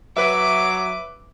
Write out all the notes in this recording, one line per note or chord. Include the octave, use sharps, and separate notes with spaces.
F#3 B4 E5 D6